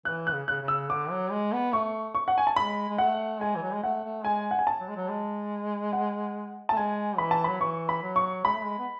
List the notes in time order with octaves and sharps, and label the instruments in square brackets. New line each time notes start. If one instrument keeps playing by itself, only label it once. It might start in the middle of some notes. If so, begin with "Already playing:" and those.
[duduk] E3 [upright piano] F#6
[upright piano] F#6
[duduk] C#3
[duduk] C#3 [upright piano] F#6
[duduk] C#3
[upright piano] E6
[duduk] D3 [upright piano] D6
[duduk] F#3
G#3
B3
[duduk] A3 [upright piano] C#6
[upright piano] C#6
F#5
G#5
A5
[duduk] G#3 [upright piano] B5
[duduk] G#3
[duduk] A3 [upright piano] F#5
[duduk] G#3 [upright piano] G#5
[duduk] E3
F#3
G#3
[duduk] A3 [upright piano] F#5
[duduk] A3
[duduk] G#3 [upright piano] G#5
[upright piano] F#5
G#5
A5
[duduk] F#3
G#3
F#3
G#3
[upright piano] F#5
A5
[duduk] A3
[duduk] G#3 [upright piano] G#5
[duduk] E3 [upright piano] B5
[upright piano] A5
[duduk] F#3 [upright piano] B5
[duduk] E3 [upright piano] C#6
[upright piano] B5
[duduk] F#3
[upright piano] C#6
[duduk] G#3 [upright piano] B5
[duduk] A3
G#3
B3